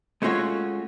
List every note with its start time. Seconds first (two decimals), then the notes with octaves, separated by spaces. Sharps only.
0.22 G#3 A3 C#4 F4 F#4 C#5